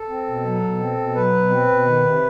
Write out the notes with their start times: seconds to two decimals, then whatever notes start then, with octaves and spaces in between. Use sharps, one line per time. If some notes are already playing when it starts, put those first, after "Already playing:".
Already playing: A4
0.09 C4
0.27 B2
0.44 F#3
0.62 B2
0.79 C4
0.97 B2
1.15 F#3 B4
1.33 B2
1.50 C4
1.68 B2
1.85 D#3
2.03 C3